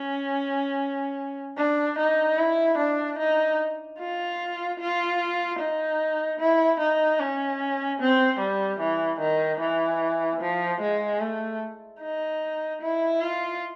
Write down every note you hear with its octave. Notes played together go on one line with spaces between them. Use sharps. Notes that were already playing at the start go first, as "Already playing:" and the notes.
Already playing: C#4
D4
D#4
E4
D4
D#4
F4
F4
D#4
E4
D#4
C#4
C4
G3
E3
D#3
E3
F3
G#3
A3
D#4
E4
F4